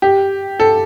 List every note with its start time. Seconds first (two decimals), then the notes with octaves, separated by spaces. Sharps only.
0.02 G4
0.60 A4